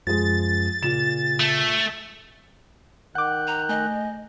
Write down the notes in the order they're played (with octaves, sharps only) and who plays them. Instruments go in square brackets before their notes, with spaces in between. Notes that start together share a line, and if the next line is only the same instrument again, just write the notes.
[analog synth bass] F#2 [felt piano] F3 G#3 [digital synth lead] A6
[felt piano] A#2 E7 [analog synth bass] C#3
[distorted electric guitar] A3
[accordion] D#3 F#6 G6 [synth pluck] F#5 D6
[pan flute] A#5
[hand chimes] A3 G#5 [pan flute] D#5